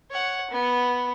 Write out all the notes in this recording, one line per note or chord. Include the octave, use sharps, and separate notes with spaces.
C#5 F#5
B3